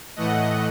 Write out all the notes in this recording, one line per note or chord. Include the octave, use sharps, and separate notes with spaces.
A2 E3 A3 D#5 F#5